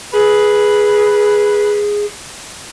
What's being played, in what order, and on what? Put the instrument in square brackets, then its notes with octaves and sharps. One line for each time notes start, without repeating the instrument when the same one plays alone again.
[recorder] G#4 [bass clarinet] B4